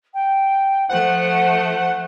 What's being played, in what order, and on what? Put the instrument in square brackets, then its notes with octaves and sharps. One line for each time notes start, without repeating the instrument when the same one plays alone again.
[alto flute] G5
[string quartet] F3 A3 [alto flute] C5 [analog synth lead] F#5